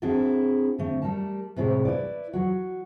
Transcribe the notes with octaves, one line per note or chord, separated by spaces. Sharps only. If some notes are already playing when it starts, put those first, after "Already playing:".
C4 D4 E4 F#4 G#4 A4
D3 A3 C4
G3 A3 A#4 A5
A2 C3 G#3 E4 C#5
E4 B4 D5
F#3 F#4